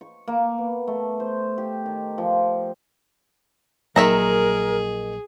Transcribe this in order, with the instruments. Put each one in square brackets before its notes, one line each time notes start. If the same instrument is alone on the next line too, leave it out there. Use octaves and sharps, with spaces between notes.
[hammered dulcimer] C#6
A#3
B3
A3
C5
G4
D#3
F3
[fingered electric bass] A#1 F#3 A#3 [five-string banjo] D#3 E5 A#5 [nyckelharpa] G#4 [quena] A#4